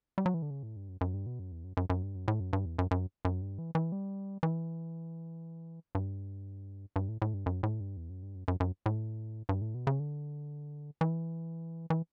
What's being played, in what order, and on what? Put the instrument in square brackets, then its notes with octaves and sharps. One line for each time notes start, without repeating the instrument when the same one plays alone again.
[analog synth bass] G3
F#3
E3
D3
C#3
A2
G2
F#2
F#2
G2
B2
F#2
E2
F#2
F#2
F#2
G2
F#2
A2
F#2
G2
E2
F#2
F#2
F#2
G2
E3
E3
G3
E3
G2
G2
A2
A2
G2
F#2
A2
G2
E2
F#2
G2
F#2
F#2
F#2
A2
G2
A2
B2
C#3
D3
E3
E3